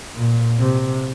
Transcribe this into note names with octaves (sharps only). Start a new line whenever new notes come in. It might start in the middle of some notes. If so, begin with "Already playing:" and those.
A#2
C3